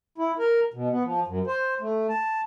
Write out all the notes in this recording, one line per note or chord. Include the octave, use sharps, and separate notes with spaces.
E4
A#4
B2
B3
F3
F#2
C5
A3
A5